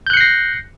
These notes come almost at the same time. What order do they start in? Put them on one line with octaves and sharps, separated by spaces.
G6 F#6 C#7 C7 A#6